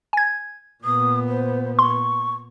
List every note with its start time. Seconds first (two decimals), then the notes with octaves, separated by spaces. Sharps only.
0.13 G#5 G#6
0.84 A#2 B3 D#6
1.29 C5
1.79 C6 C#6